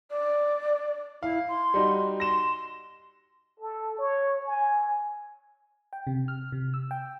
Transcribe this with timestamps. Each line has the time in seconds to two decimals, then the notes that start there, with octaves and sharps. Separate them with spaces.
0.10 D5
1.23 E4 F5
1.48 C6
1.74 G3 D#4 F#4
2.20 C6 A#6 E7
3.60 A4
3.98 C#5
4.46 G#5
5.93 G5
6.07 C3
6.28 F6
6.52 C3
6.74 E6
6.91 G5